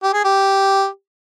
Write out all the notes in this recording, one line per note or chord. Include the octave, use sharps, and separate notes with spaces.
G4
G#4
G4